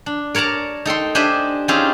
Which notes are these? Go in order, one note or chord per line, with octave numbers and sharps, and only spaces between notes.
D4
A#4 C#5 D5 A5 A#5
D#4 A4 G5 C6
D4 G4 C5 D#5 E5 G#5
C4 C#4 D#4 F4 G4 G#4